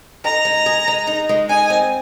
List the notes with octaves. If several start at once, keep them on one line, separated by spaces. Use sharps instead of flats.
D#4 A#5
G#3
G#4
G#3
D#4
G#3
D#4 G#5
C4